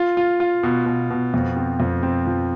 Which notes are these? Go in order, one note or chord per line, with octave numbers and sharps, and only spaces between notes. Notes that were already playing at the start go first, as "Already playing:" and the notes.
Already playing: F4
F4
F4
B2
B2
B2
F2
C4
F2
C4
F3